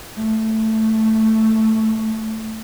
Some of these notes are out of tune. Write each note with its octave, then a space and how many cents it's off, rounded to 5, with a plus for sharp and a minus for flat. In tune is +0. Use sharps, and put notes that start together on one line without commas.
A3 +5